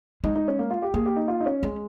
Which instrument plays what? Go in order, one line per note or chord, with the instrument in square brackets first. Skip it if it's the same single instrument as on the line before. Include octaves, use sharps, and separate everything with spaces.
[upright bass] G#3 [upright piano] D#4
[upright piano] D#4
C#4
A#3
F4
G4
[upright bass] A#3 [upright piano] G#4
[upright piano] G4
D#4
F4
D#4
C#4
[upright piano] G#3 [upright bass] C#4